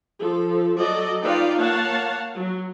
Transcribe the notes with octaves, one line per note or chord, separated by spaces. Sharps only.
F3 A4
F#3 F#4 A4 D5 D#5
D#4 F4 B4 D5 F5 G5
A#3 C#5 F5 F#5 A5
F#3